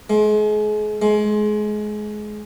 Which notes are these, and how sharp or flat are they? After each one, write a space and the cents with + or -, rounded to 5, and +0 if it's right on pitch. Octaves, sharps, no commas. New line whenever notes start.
G#3 +35
G#3 +25